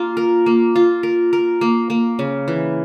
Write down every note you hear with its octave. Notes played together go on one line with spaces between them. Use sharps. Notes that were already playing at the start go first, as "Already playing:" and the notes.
Already playing: A#3 F4
A#4
A#3
F4
A#4
A#4
A#3
A#3
C#3
E3